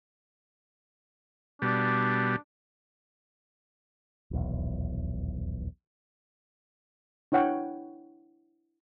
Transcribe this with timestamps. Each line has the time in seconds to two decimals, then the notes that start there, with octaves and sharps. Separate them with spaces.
1.62 B2 G3 D4
4.31 D#1 B1 E2
7.32 D4 E4 C#5 F#5 G5